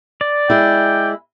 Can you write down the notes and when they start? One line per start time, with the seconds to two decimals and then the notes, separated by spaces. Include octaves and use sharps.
0.21 D5
0.50 G#3 E4 G5